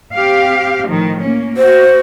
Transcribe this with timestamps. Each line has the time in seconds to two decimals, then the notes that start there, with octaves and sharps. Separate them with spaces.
0.14 C4 G4 F5
0.88 A2 D#3 F3
1.22 A#3 C#4
1.57 F#4 C5